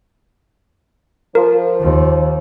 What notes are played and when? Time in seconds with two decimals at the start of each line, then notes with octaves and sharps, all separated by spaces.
1.35 F3 A#4
1.81 D#2